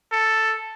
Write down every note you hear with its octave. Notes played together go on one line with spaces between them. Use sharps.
A4